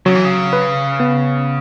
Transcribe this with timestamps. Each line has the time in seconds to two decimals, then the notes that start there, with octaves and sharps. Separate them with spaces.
0.06 C#3 F#3
0.15 E3
0.25 C#3
0.53 B4
1.00 B3